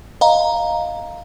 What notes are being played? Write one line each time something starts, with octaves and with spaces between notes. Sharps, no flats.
D#5 F5 A#5